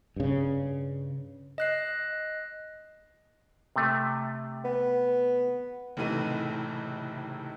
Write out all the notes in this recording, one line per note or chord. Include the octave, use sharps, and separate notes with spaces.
G2 C#3
D#5 F#6 C7
C3 A3
B3
F#1 A2 C3 E3 D#4 D#7